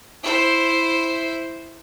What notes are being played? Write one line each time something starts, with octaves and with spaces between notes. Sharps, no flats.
E4 C5